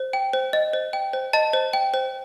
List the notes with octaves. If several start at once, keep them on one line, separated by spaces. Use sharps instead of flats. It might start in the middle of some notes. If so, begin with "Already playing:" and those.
Already playing: C5
G5
C5
D#5
C5
G5
C5
D#5 A5
C5
G5
C5